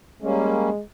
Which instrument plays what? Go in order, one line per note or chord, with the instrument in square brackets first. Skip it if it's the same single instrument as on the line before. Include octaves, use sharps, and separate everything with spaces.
[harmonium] G3 A#3 C#4 [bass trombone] G#3